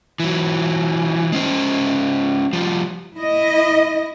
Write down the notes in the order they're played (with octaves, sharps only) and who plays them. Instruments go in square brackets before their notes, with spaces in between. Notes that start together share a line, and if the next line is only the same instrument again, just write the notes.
[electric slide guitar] E3 F#3
G#3 C#4 C5
F3 G3
[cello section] E4 D#5